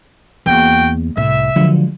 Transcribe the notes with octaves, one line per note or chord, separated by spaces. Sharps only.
E2 A#3 F#4 G5
C2 A2 E5
D3 F3 F#3 G#3